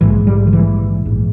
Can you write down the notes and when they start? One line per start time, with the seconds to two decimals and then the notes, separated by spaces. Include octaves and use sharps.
0.01 A#1 G#2 E3
0.27 G3
0.47 D#3
0.53 E3
1.05 A#1 G#2